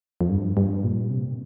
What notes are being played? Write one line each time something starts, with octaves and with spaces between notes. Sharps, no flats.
F2
G2
G2
A#2
C3